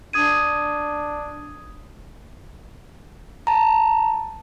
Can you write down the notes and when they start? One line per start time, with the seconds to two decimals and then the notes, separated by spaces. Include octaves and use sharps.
0.13 D4 D#6 G#6 D#7
3.47 A5 A#5